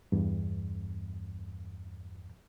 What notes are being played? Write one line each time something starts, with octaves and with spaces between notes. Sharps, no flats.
E2 G2